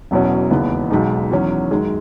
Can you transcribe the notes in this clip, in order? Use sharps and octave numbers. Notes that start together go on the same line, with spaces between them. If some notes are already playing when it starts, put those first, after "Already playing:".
E1 E2 B2 F#3 C#4
E1 D#2 C#3 E3 B3
B1 B2 G#3 D#4
E2 D#3 F#3 C#4
F#2 D#3 G#3